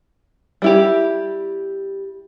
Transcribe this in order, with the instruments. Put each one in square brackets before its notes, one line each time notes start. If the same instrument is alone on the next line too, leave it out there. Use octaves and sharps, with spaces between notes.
[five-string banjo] G3 E4 G4